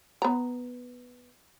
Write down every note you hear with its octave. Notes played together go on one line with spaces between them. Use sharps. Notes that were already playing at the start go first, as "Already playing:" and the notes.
B3 A#5